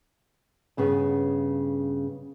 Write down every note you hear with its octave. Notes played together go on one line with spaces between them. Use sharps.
G2 C#3 B3